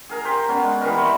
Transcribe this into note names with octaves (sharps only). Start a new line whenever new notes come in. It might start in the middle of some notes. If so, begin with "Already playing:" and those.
G#4 A#4 A#5
G4 C5
B3 C#4 D5
G#3
E3 G3 B3 A#4
C4 C#6